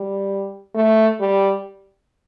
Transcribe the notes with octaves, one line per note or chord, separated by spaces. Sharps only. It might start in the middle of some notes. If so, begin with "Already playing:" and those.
Already playing: G3
A3
G3